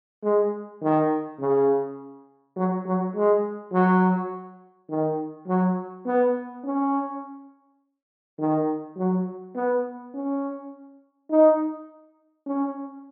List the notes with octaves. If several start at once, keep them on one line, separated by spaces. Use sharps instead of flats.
G#3
D#3
C#3
F#3
F#3
G#3
F#3
D#3
F#3
B3
C#4
D#3
F#3
B3
C#4
D#4
C#4